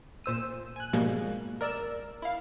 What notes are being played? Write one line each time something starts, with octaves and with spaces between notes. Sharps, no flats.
A#2 C5 E6 D#7
G#5 F#6
G#2 B2 F3 G3 G#3 A#3
A#4 D5 E6
E4 F5